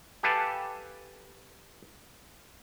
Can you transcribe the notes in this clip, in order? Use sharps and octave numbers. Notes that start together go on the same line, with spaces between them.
G4 A4 B4 F5 G#5 A5